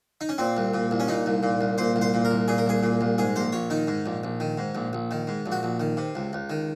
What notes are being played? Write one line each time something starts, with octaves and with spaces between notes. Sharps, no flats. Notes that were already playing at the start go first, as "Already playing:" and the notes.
D#4
C#4
A#2 C4
C2
A#2
C2
C#4
A#2 D#4
C2
A#2
C2
A#2 C5
C2
C5
A#2
A#4
C2
A#2 G#4
A#4
C2 G#4
A#2
C2
G#2 G#4
A#1 C5
A#1 C#5
D#3 D#4
G#2
A#1
A#1
D#3
G#2
A#1
A#1
D#3
G#2
A#1
F#4
A#1
D#3
C3
C#2
C#2
D#3